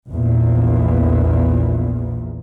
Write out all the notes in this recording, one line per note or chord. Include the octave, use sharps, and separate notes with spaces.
A#1 E2 A#2